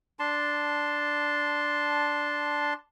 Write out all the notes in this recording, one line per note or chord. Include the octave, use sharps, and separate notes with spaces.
D4 A5 C6